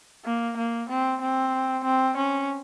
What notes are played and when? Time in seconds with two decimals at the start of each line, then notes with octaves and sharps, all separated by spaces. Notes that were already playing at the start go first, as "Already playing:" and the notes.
0.25 A#3
0.57 A#3
0.89 C4
1.21 C4
1.84 C4
2.17 C#4